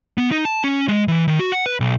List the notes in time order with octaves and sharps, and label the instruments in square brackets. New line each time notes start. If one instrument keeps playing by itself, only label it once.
[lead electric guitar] B3
D#4
A5
C#4
G#3
E3
D#3
F#4
F#5
B4
B1